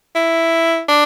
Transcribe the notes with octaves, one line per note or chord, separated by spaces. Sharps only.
E4
D4